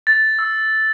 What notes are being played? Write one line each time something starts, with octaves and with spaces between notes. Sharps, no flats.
A6
E6